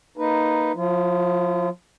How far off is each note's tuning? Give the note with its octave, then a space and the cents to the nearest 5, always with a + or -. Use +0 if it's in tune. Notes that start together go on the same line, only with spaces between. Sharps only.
A#3 -10 D#4 +0 B4 +0
F3 +30 F4 -40